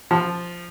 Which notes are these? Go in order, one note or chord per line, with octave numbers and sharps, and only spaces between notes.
F3